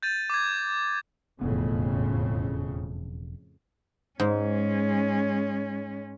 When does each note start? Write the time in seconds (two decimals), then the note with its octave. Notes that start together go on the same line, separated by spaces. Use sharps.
0.03 G6 A6 D#7
0.30 D6 G#6
1.41 E1 F2 A2 C#3 B3
4.20 G#2 G#3 C#4